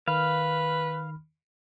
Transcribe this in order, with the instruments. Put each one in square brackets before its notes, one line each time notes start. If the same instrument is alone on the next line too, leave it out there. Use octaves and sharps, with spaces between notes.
[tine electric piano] D#3 B5 F6 [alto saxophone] B4 [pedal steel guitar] F5